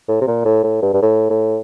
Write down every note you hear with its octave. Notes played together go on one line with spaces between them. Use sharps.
A2
C3
A#2
A2
A2
G2
G2
A2
A2